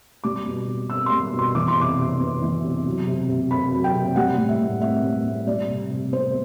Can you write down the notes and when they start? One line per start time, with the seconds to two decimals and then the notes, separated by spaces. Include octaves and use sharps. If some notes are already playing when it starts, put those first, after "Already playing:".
0.24 G3 D6
0.46 B2
0.68 B2
0.90 C4 E6
1.06 G3 C6
1.33 B2
1.39 C6
1.55 E3 D6
1.68 C6
1.77 C3 D6
1.98 C3
2.20 B3
2.42 E3
2.64 C3
2.86 F#3
3.07 C3
3.29 C3
3.50 C4 B5
3.72 F#3
3.84 G5
3.94 C3
4.16 G3 F#5
4.38 A2
4.49 E5
4.60 A2
4.82 C4 E5
5.04 G3
5.25 A2
5.47 G3 D5
5.69 C3
5.91 C3
6.12 B3 C5